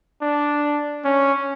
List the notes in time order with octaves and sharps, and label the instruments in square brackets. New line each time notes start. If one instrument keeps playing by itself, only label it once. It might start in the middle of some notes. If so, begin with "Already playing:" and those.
[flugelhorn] D4
C#4